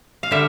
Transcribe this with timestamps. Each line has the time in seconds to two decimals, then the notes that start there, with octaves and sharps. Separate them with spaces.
0.23 F5
0.31 D3 G3 E5